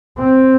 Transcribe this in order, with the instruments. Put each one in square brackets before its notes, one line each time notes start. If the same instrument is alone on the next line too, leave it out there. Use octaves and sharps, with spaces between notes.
[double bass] C4